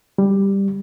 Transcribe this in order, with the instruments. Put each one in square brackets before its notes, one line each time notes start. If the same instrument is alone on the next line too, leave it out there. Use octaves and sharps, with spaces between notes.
[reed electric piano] G3